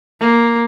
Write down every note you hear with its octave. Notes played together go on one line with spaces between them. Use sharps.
A#3